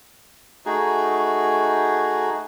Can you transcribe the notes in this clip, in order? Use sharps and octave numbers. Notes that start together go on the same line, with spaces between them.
A3 D#4 F#4 G#4